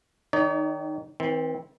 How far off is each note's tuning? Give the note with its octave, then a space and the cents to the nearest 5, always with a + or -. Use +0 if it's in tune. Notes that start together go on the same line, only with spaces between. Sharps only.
D#3 +0 D#4 -20 C#5 +45
E3 -45 C4 +0